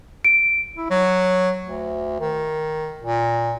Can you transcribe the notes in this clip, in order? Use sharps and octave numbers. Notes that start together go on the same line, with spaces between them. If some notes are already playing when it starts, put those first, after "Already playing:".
D7
E4
F#3
D2
D#3
A#2